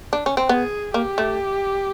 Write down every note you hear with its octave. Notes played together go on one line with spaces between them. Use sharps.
D4
C#4
C4
B3 G#4
A#3 G4
A3